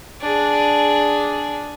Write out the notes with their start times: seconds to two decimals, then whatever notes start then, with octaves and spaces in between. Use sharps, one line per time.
0.21 D4 G#4